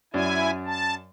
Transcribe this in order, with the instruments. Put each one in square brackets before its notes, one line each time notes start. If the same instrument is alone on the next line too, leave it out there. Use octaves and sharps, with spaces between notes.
[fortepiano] F#2 D5 [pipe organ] E4 G#5
[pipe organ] A5